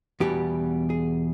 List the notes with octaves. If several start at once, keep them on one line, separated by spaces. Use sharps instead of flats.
E2 B2 G3 G4
G#4